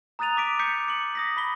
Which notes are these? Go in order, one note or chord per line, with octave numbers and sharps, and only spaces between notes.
A#5 D#6 F#6 A6 D#7 F7
D6 B6 D7
D6 G6 B6 C#7
C#7 F#7
D#6 A#6 B6
B5 B6 G7